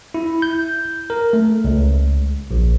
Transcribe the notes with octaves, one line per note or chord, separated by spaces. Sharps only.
E4
G6
A#4
A3
C#2
A#1